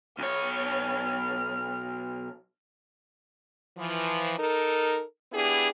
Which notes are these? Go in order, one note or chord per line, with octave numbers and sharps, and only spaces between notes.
B1 C#5 F6
E3 F3
D#4 A4 A#4
B3 D4 E4 G4 G#4